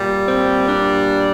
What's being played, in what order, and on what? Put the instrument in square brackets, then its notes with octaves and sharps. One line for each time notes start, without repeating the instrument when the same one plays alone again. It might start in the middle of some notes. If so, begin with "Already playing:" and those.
Already playing: [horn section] A#2 G3
C4
D4